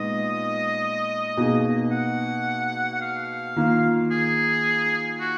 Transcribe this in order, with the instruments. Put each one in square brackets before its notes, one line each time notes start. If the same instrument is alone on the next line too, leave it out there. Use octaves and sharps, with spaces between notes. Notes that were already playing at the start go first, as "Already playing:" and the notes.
Already playing: [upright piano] A#2 G#3 B3 D#4 [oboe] D#5
[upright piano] B2 A#3 D#4 G#4
[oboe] F#5
F#5
F5
[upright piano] D#3 A#3 F4
[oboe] G#4
F#4